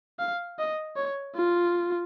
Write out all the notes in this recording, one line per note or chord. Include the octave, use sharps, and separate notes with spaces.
F5
D#5
C#5
F4